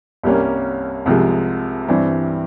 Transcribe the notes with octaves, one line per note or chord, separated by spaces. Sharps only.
C2 C3 G3 A#3 C#4
C2 C3 F3 G#3
G2 E3 G3 C4